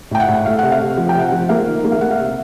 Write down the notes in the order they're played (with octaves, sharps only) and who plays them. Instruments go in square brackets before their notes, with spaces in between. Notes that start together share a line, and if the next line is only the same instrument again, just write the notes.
[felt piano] A2 G5
F#5
A2
A3 F5
C3 F#5
F5
C3
F3 F#5
G5
C3 F#5
F3
A#3 F5
D#3
A#3
F5
A#3 F#5
F5
C3 E5